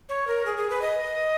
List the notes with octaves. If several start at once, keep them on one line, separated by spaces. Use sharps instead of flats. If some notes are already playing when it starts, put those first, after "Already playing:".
C#5
A#4
G#4
G#4
B4
D#5